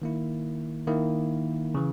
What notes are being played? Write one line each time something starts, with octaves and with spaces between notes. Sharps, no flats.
D#3 A#3 E4
D#3 A#3 E4
C#3 E3